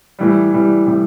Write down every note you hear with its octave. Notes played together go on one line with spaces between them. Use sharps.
A2 E3 G3
A2 E3 G3
A2 E3 G3